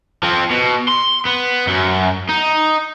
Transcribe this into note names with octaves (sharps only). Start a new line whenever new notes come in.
F3 C4
B2
C6
B3
F#2
D#4